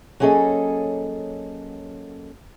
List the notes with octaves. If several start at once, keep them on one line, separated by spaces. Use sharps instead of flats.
F#3 A#3 C#4 G#4 A4 D#5